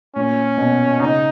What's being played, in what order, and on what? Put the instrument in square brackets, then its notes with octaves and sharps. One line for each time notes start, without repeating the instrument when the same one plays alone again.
[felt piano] A#2 [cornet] C#4
[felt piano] B2
[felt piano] C#3 [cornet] D#4